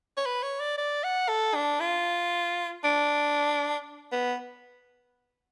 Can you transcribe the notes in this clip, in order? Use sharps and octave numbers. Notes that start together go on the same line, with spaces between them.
C#5
B4
C#5
D5
D5
F#5
A4
D4
F4
D4
B3